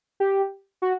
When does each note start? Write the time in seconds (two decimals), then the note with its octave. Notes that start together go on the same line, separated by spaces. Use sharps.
0.20 G4
0.82 F#4